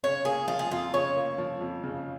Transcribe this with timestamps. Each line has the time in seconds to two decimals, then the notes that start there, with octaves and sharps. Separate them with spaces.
0.03 C#3 C#5
0.25 A#3 G#4
0.48 F3 F4
0.59 G#4
0.71 F2 F4
0.93 C#3 C#5
1.16 A#3
1.38 F3
1.61 F2
1.84 C#3